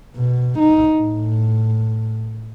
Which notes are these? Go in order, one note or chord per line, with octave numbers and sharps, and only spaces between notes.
B2
D#4
A2